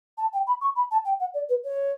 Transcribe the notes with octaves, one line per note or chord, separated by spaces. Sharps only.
A5
G5
B5
C#6
B5
A5
G5
F#5
D5
B4
C#5